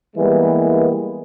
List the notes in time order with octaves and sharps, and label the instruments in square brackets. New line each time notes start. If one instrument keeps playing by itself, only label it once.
[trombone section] E3 G3 G#3 A#3 B3